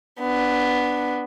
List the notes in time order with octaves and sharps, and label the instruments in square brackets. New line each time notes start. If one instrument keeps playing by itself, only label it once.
[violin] B3 D4